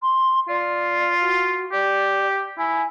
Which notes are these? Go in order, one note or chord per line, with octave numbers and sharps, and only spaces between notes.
C6
F4 D5
F#4
G4 D5
E4 G#5